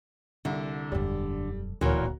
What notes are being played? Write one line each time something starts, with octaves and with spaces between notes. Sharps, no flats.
C2 D3
E1 F#2 G3
D1 D2 A#2 E3 F#4 A#4 C#5